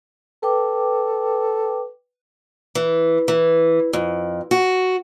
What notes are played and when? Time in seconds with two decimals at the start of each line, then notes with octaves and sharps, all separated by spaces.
0.43 A4 B4 G5 D6
2.75 E3
3.28 E3
3.93 F2
4.51 F#4